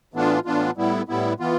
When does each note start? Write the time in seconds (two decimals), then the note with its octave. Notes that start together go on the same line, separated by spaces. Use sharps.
0.14 A2 E3 B3 D4 F4
0.45 A2 E3 B3 D4 F4
0.77 A2 G3 B3 E4
1.08 A2 G3 B3 E4
1.40 E3 B3 F4